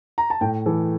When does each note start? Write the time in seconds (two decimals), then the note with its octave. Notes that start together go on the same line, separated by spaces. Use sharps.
0.18 A#5
0.30 A5
0.41 A2 G5
0.66 E3 A4